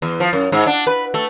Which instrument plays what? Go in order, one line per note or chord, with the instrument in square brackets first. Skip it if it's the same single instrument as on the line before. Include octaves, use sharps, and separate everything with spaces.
[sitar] E2
F3
F#2
G#2
D4
B4
A3